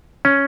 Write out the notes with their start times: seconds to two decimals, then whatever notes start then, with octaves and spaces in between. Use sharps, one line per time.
0.25 C#4